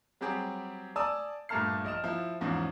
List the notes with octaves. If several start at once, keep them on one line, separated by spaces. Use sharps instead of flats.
F#3 G3 C4 G4 G#4
D5 G#5 A5 D#6 E6
G2 A#2 A3 A5 F6 C7
A#1 D#5 F6 E7
F3 E4
E2 G#2 F3 C#4